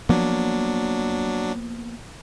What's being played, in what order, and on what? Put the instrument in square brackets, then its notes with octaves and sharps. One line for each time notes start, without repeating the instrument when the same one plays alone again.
[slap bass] F3 A#3 B3 [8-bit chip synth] F#3 D4